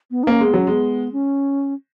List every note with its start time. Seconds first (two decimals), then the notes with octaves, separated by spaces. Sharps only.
0.11 B3
0.23 D#4
0.27 A#3 C#4
0.40 G#3 B3
0.54 F#3 C#4
0.67 G#3 B3
1.12 C#4